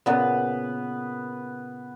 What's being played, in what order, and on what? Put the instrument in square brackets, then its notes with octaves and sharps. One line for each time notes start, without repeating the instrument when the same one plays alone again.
[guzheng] A#2 C#3 [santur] B3 B4